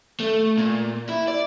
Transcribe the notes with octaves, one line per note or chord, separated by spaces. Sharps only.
A3
A#2
E4
D5